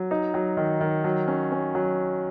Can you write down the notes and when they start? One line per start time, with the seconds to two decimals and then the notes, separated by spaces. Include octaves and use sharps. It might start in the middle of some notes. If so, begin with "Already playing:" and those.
Already playing: F#3
0.11 D#4
0.34 F#3
0.57 D#3
0.81 D#3
1.04 F#3
1.28 C#4
1.52 C#4
1.75 F#3